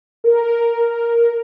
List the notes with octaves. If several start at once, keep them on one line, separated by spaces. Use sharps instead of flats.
A#4